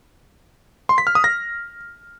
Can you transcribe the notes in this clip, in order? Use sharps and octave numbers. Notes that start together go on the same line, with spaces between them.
C6
B6
F6
D#6
A#6